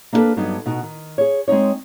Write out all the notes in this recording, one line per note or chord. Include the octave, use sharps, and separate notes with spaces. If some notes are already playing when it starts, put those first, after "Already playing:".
A#3 D4 E4 G#4 A4 B4
G2 F#3 B3 D4 D#4
B2 D#4 F#4
D#3
G#4 C#5
G#3 C4 C#4 D#4 C#5